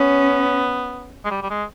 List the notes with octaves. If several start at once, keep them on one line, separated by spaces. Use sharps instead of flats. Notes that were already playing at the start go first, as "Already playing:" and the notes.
Already playing: B3 C#4
G#3
G3
G3
G#3